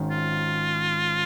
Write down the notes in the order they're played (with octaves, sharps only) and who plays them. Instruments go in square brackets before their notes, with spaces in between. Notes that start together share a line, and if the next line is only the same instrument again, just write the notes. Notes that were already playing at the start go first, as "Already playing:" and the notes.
Already playing: [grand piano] G#1 G#2 D#3 G#3 C#4
[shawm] F4